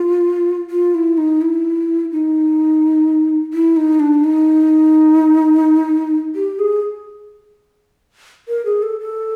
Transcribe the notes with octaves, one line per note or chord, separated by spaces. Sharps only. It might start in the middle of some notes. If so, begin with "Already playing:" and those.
Already playing: F4
F4
E4
D#4
E4
D#4
E4
D#4
D4
D#4
G4
G#4
A#4
G#4
A4
A4